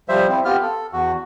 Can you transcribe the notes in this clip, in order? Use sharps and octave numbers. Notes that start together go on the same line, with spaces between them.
F3 G3 C5 E5
C4 E4
B3 F4 G4 F6
A4
E2 F#4